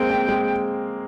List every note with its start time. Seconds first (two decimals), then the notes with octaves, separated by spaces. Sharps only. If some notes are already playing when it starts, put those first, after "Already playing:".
Already playing: G#3 A#3 C4 G5
0.10 C4
0.29 G#3